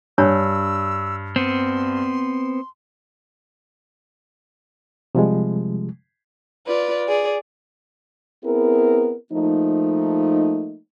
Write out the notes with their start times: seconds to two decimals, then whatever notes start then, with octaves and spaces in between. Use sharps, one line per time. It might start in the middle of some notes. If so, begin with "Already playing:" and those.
0.18 G2 D4 C#5 E6
1.36 B3 C4 C6
5.15 C3 F3 G3 G#3
6.67 F4 B4 D5
7.08 G#4 D5
8.44 B3 C4 E4 G#4 A#4
9.33 F3 A3 A#3 D#4